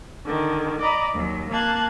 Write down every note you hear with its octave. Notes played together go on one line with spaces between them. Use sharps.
D3 D#3
D5 D#5 A#5 B5
D#2 F#3
A#3 A5 F#6 G#6